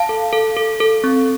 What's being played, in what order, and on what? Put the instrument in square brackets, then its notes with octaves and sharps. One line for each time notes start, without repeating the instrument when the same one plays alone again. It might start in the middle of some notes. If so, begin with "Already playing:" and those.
Already playing: [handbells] F5 A5
A4
A4
A4
A4
C4